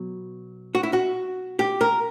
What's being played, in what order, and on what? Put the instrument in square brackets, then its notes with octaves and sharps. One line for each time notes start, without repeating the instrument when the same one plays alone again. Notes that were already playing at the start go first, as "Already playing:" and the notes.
Already playing: [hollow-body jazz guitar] B2 F#3
F#4
E4
F#4
G4
A#4